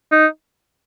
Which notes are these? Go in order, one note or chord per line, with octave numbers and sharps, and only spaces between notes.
D#4